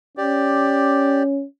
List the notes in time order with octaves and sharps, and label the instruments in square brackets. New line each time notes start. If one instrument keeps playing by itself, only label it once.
[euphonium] C#4 [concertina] G4 D5